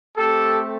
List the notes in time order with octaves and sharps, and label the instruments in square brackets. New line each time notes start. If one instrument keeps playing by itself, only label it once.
[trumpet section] A3 C4 G4 A4